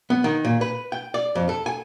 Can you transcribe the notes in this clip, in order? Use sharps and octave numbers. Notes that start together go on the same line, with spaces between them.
B3
D#3
A#2
B4
G5
D5
F2
A4
G#5